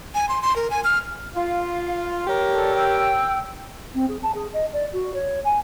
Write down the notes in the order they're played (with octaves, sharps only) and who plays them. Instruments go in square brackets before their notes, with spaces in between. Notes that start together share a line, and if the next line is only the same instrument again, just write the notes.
[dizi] G#5
C6
C6
A#4
G#5
F6
[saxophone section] F4 [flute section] F5
[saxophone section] G4 A#4 C#5
[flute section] A4 D5
G5 E6
[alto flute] C4
G#4
A5
G#4
D#5
D5
F#4
C#5
G#5